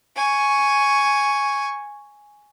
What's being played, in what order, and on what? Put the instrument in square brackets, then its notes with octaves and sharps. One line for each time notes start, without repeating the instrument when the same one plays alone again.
[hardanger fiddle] G#5 C#6